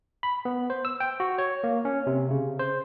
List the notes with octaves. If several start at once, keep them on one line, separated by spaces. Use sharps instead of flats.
B5
B3
C5
E6
G5
F#4
C#5
A#3
C#4
C3
C#3
C5